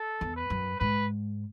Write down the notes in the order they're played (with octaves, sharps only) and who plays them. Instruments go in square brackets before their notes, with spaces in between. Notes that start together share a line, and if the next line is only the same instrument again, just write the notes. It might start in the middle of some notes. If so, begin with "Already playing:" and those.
Already playing: [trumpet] A4
[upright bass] E2
[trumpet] B4
[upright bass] F#2
[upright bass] G#2 [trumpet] B4